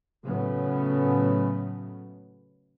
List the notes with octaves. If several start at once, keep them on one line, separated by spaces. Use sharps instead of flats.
A2 C#3 F#3 A3 B3